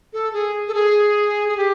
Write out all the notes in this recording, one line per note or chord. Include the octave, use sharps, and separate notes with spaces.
A4
G#4
A4
G#4
G#4
G4